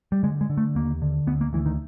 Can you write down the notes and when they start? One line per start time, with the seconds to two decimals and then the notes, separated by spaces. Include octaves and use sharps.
0.12 G3
0.23 D3 G#3
0.41 G#3
0.50 D3
0.57 A3
0.75 D#2 A#3
1.02 D3
1.27 D2 B3
1.41 A#3
1.53 D2 E3
1.66 D#3